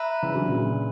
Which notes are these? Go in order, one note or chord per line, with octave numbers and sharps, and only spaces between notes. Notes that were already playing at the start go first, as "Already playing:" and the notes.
Already playing: B4 E5 A#5
C#3 E3
D3 F#3
A#2 C#3